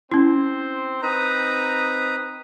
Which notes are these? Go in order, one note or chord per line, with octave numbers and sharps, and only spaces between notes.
C4 C#4 E4 C5
C4 D#4 B4 A#5 D#6